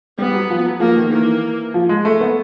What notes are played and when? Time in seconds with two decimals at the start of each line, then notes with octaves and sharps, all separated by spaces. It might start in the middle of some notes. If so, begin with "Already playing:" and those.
0.18 G3 B3
0.34 F#3
0.50 F3
0.65 F#3
0.80 F3 A#3
0.96 D#3
1.12 E3 A#3
1.74 F3
1.89 G#3
2.05 A3
2.21 B3